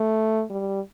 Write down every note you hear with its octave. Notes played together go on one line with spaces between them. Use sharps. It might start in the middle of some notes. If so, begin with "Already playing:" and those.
Already playing: A3
G3